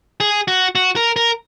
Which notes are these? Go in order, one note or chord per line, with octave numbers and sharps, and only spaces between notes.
G#4
F#4
F#4
A#4
A#4